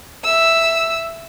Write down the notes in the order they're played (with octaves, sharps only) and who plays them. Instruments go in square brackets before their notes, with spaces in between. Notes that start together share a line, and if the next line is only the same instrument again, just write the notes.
[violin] E5 E6